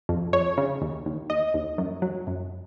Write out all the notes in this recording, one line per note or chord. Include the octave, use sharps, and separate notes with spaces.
F2
F2 C#5
C#3
D#2
D#2
D#2 D#5
D#2
F#2
F#3
F#2